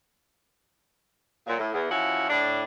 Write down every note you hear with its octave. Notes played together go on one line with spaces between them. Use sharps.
A#2 F#3
A2
E2
F3 C#4 E4 F#4
A2 D4